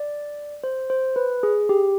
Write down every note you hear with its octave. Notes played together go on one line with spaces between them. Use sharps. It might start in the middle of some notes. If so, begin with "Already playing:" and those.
Already playing: D5
C5
C5
B4
G#4
G4